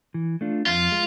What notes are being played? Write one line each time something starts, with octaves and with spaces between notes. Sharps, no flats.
E3
A3 D4 F4
F2 F4
G#3